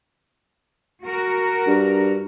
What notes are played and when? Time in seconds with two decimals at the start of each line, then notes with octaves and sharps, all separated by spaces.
1.03 F#4 A#4
1.67 G2